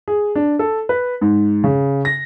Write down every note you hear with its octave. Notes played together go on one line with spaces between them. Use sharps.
G#4
D4
A4
B4
G#2
C#3
A#6